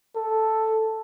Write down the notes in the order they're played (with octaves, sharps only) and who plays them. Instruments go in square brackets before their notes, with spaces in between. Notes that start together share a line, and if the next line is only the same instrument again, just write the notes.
[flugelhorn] A4